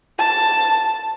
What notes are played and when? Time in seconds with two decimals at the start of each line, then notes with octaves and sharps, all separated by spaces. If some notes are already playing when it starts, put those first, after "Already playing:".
0.18 A5